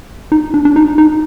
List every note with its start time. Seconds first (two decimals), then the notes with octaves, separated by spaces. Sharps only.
0.32 D#4
0.54 D4
0.65 D4
0.76 D#4
0.98 D#4